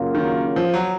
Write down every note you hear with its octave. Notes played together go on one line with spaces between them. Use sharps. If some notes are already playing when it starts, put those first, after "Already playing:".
Already playing: F#2 C#3 F#3 A#3 F4
D#3
F3
F#3